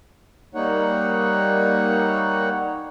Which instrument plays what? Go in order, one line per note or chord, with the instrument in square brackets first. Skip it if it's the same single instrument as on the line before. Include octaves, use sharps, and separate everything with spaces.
[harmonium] G3 A#3 D#4 C#5 F#5